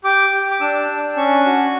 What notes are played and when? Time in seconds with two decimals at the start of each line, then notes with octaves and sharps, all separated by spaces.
0.04 G4 D6
0.33 G4
0.51 D6
0.61 D4 E6
0.89 D4
1.17 C#4 C#6
1.46 F#4